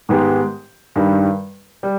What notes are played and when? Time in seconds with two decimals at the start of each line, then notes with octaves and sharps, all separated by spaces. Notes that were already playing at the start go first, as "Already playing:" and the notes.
0.09 G#2 D#3 G#3 B3 G4
0.96 G2 D#3 G3
1.83 G3